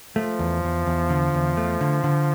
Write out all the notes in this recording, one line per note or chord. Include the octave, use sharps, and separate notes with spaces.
F3 A3
E2
E2
E2
D3
E2
A3
D3
D3